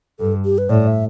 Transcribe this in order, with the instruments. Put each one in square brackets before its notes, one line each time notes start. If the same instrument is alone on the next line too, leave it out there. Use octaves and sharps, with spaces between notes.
[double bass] G2 [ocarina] A4
[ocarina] G4
B4
[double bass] A2 [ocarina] D5
[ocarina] E5